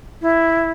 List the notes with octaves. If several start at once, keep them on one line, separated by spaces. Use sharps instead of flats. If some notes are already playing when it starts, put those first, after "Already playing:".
E4